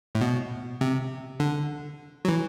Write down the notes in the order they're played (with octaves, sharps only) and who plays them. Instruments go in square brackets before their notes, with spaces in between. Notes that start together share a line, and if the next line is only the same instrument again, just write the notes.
[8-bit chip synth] A2
B2
C3
D3
F#3
E3